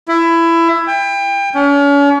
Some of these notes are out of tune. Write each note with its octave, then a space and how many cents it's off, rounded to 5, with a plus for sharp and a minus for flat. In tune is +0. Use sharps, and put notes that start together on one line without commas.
E4 +20
G5 +30
C#4 +40